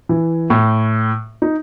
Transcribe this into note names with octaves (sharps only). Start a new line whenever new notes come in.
E3
A2
D#4